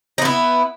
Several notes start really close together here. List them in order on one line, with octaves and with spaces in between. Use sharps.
D#4 B3 E4